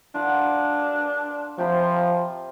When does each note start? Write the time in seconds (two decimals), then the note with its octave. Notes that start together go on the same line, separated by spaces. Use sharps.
0.14 D4 F4 A#4 F#5
1.58 C3 F3 G5 B5